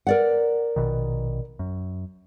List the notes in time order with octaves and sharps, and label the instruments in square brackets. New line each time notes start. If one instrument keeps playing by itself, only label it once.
[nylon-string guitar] A#4 D5 F#5
[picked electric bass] A#1 B2 D#3
F#2